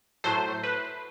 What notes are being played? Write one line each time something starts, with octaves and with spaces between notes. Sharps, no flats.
A2 F#3 A3 C5
B4